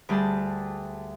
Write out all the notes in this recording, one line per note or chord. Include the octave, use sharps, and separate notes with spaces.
D2 G3 G#4 G5 A5